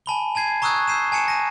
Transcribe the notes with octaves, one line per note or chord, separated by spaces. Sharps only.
G#5 A5 B5 G7
G#5 A5 G#6 C7
A#5 C#6 D#6 E6 F#6 G#6
E6 G6 C7 D#7 E7
G#5 A5 C#7 E7
A#6 D#7